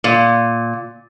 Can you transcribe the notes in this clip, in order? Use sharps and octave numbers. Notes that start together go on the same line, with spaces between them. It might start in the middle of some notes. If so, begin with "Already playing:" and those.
A#2